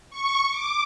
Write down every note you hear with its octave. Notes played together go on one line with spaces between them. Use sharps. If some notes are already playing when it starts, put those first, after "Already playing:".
C#6
D6